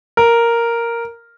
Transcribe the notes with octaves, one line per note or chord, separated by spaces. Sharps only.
A#4